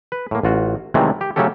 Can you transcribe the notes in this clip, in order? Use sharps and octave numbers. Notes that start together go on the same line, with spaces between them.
B4
A2 A#3
A1 F4 F#4
C3 D#3 E3 F#3 G#3 A3
G4
C#3 F#3 A3 C#4 G4 A4